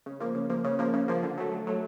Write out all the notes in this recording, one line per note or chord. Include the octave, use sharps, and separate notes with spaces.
C#3
F3 A#3
C#3
F3 A#3
C#3
F3 A#3
C#3
F3 A#3
D3
F#3 A3
D3
F#3 A3